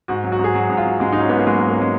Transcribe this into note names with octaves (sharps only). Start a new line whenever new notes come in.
G#2 F#4
F#3
F#4
G#2
G#4
F#3 F#4
G#2
F4
F#3
G#2 G#3
D#4
F#3 C#4
G#2 B3
A#3
F#3 G#3
A#3
G#2
A#3
F#3 G#3